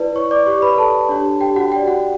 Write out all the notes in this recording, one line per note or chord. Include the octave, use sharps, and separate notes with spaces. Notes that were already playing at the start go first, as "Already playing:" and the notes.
Already playing: E4 B4 D5
C#5 C#6
D5 D6
G4 C#5 D5 C#6
B4 B5
A4 A5
D4 G4 C#5
G4 G5
F#4 F#5
G4 D5 G5
F#4 F#5